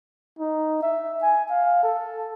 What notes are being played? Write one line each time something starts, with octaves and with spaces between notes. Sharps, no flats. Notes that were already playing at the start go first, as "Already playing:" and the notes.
D#4
E5
G#5
F5
A4